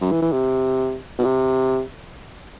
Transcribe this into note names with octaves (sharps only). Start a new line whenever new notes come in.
F#2
E3
E3
C3
B2
C3